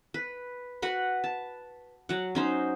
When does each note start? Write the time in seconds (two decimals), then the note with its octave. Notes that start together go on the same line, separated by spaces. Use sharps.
0.14 B4
0.82 F#4 B4 F#5 B5
1.24 A5
2.09 F#3 F#5
2.35 C#4 D#4 C5